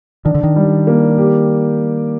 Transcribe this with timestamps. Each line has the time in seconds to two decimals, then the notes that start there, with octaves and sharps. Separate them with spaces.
0.25 D#3 D4
0.35 D3
0.44 D#3
0.56 G3
0.87 A#3
1.18 G4